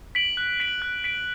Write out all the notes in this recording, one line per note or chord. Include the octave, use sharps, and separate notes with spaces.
B6 D7 F#7
F#6
B6 D7 F#7
F#6
B6 D7 F#7